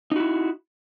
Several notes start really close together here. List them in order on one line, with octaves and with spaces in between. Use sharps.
D#4 F#4 E4